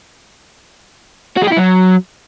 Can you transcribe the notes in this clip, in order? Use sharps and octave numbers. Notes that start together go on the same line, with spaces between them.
F#4
G#3
G4
E4
F#3